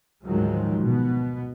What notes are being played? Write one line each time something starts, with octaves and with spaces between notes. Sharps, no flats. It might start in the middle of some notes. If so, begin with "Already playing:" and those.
D2 G#2 D#3 F3 F#3 G#3
B2 B3